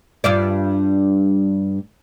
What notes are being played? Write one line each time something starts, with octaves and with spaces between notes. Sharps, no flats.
G2 F4 D5